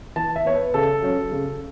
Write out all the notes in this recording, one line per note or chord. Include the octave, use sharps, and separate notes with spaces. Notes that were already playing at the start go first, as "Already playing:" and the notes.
E3 A5
E5
B3 C#5
B4
C#3 A4
F#3 C#4
C#3